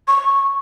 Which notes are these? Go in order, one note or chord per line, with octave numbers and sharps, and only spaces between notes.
C#6